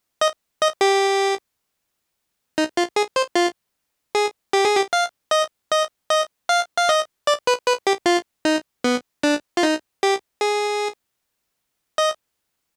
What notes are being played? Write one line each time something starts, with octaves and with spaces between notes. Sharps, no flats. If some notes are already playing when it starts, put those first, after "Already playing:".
D#5
D#5
G4
D#4
F4
G#4
C5
F4
G#4
G4
G#4
G4
F5
D#5
D#5
D#5
F5
F5
D#5
D5
B4
B4
G4
F4
D#4
B3
D4
F4
D#4
G4
G#4
D#5